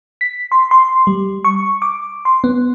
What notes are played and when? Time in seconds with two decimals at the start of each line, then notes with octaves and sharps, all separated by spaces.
0.21 B6
0.52 C6
0.71 C6
1.07 G3
1.44 C#6
1.82 D6
2.25 C6
2.44 B3